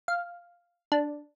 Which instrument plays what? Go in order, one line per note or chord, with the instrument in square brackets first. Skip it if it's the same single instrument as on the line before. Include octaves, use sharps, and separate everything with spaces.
[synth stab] F5
D4